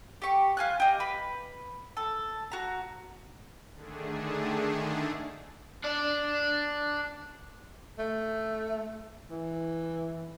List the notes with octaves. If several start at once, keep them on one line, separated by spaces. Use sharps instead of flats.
G4 C#6
F4 G#5 F#6
G4 D#5
B4 B5
A4
F#4 A#5
D3 D#3 A3 D4 G#4
D4 D5
A3
E3